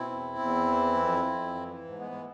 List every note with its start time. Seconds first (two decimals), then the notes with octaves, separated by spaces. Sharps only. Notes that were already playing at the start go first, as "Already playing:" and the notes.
Already playing: B2 C4 E4
0.10 E2
0.39 E2
0.67 E3
0.97 F2
1.26 F2
1.55 E3
1.84 G#2
1.99 G#3 B3
2.11 G#3